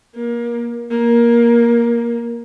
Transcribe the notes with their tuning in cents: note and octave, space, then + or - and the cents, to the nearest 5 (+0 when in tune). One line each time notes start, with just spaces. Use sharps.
A#3 +25
A#3 +15